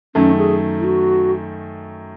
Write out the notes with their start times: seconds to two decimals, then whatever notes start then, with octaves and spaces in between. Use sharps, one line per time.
0.15 F#2 D#3 A3 C#4
0.38 G#4
0.80 E4
0.84 F#4